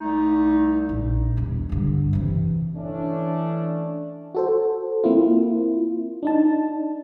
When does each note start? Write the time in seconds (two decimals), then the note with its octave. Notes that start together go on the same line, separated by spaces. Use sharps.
0.01 C2 A3 D#4
0.89 A#1
1.37 E1 C2
1.69 G2 D3
2.13 C3 E3
2.76 E3 A3 C#4 D4
4.35 F#4 A4 C5
5.04 A#3 C4 E4 F4
6.23 D4 D#4 A5